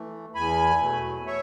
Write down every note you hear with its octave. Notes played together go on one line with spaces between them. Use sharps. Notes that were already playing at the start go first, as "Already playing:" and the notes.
Already playing: E3 A3
E2 G#5 B5
B2 F#3 A3
C#5 E5